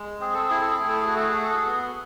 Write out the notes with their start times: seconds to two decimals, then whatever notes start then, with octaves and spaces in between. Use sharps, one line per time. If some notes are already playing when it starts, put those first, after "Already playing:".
Already playing: G#3
0.20 C4 G#4
0.34 A4
0.48 E4 G#4
0.61 A4
0.75 A3 G#4
0.88 A4
1.02 G#4
1.08 F#4
1.16 A4
1.29 G#4
1.37 F#4
1.43 A4
1.56 G#4
1.66 B3